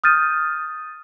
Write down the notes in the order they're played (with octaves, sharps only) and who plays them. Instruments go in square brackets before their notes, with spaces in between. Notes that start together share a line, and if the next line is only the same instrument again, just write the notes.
[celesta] D#6 F6 G6 A6 D#7